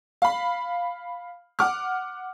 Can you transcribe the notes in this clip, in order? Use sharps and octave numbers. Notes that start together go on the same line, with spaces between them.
F5 B5
F#5 D6 F6